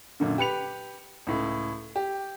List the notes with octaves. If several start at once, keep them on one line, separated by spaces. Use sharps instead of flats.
F#2 A#2 D3
G4 B4 C#7 F7
C#2 A2
G4